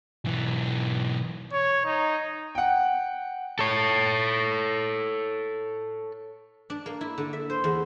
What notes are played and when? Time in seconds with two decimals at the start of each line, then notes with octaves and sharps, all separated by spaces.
0.25 B1 E3
1.52 C#5
1.85 D#4
2.55 F#5 G5
3.59 A4 C#5
6.70 D4
6.86 A#3
7.01 E4
7.18 D3
7.33 E5
7.50 C5
7.64 E2